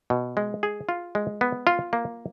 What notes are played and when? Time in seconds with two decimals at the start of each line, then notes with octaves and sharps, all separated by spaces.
0.10 B2
0.37 G#3
0.63 G#4
0.89 F4
1.15 G#3
1.41 B3
1.67 F4
1.93 A#3